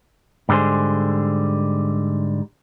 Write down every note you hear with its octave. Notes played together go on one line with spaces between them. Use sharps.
G#2 D3 G3 G#4 C5